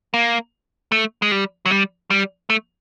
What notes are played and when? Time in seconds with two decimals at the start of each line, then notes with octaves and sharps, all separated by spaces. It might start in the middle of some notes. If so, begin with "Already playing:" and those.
0.14 A#3
0.92 A3
1.22 G#3
1.31 G3
1.66 F#3
1.71 G3
2.10 G3
2.50 A3